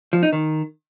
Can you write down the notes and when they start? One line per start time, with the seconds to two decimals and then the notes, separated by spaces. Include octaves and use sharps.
0.13 F3
0.23 D#4
0.33 D#3